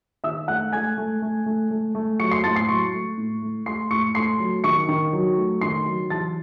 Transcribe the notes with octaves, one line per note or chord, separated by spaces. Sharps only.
D#3 E5 E6
A3 F#5 F#6
A3 G#5 G#6
A3
A3
A3
A3
A3
F#3 C#6 C#7
C6 C7
A2 A5 A6
C6 C7
F#3 C#6 C#7
A3
A2
A3
A3 C6 C7
A2 C#6 C#7
A3 C6 C7
F#3
D#3 C#6 C#7
D#3
F#3
A3
D#3 C6 C7
F#3
E3 A5 A6